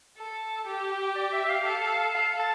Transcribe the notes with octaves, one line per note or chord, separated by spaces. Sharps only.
A4
G4
D5
E5
E5
F5
A4
A4 F5
A5